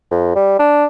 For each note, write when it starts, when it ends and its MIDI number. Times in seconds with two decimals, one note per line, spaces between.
0.11 0.34 41
0.36 0.57 55
0.59 0.85 62